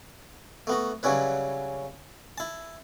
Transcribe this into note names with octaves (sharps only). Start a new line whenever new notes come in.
A3 B3 F#4
C#3 F#3 G3 C#4 E4 B4
E4 A5